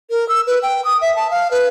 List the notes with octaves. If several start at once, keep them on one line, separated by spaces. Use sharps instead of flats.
A#4
E6
B4
G5
D#6
E5
A5
F5
B4